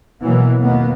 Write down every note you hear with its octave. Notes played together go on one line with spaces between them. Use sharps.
B2 E3 F#3 A#3 B3
D#2 B2 A#3 B3